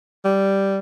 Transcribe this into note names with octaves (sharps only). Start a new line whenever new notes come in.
G3